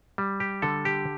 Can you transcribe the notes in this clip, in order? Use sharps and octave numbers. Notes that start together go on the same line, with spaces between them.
G3
G4
D3 A4
G4